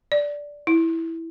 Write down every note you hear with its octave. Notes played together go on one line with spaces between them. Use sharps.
D5
E4